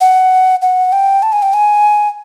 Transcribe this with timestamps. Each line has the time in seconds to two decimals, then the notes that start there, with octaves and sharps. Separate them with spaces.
0.01 F#5
0.62 F#5
0.92 G5
1.23 A5
1.33 G#5
1.43 G5
1.54 G#5